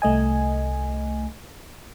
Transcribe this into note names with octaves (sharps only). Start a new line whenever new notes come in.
C2 A3 D#5 G#5